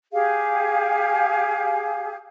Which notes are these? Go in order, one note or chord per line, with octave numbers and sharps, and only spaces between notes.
G4 G#4 F5